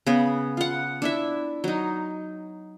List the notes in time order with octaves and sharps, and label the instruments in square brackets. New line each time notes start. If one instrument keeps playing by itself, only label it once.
[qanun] C#3 B3
F4 F#5
D4 E4 E5
F#3 D#4